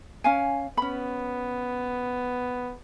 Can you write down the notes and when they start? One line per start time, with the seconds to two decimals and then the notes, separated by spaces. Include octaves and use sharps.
0.24 C#4 F5 G#5
0.77 B3 C#4 B5